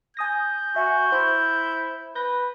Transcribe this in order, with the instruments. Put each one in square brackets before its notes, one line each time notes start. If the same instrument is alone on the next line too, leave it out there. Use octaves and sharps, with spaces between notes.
[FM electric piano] G#5 D#6 A#6 [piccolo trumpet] G6
[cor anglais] F#4 [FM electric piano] E5 G#5
[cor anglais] E4 [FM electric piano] C5
[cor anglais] B4 [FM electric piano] G6 A#6